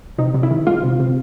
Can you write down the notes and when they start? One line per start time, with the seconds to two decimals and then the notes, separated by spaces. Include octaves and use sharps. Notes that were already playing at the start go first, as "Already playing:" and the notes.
0.18 C3 D#4
0.34 C3
0.43 E4
0.51 D#3
0.67 G#3 F4
0.83 C3
1.00 C3